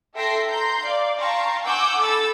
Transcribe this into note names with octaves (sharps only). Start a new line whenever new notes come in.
A4 E5 G5 C6 A#6 C7
A#5 C6 G6
D5 F5
F5 G5 A5 A#5 C6 C#6
F#5 G#5 C#6 D6 E6 G6
A4 B5 E6 A6